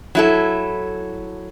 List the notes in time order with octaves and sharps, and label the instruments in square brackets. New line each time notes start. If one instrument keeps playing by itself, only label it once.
[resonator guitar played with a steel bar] F#3 E4 A4